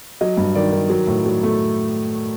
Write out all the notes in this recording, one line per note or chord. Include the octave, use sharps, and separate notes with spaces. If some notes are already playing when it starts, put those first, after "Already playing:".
F#3 D#5
G2
D#3 D5
D#3
F#3
A2
F#3
A3